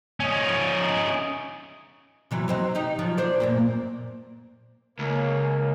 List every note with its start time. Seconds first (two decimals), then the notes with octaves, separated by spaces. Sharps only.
0.20 C#4 D#4
2.31 C3 E3 F#3
2.48 F#3 C4 D#4
2.75 D#4 G4
2.99 F3 F#3
3.17 D4 C5 D5
3.40 F#2 A#2 A#3
4.99 C#2 A#3